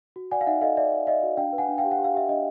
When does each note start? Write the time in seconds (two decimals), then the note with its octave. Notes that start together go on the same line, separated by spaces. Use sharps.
0.16 F#4
0.31 D5 F#5 G#5
0.41 F5
0.47 D#4 E5 F#5
0.61 A4 D#5 F5
0.77 D5 E5
0.92 D5
1.07 D5 D#5 F5
1.23 F#4
1.37 D4 F5 G5
1.53 B4
1.58 F#5 G#5
1.68 D4
1.78 F5 G5
1.84 G4
1.91 F#5
1.99 G4
2.04 F5
2.14 G4 E5
2.28 D4 D#5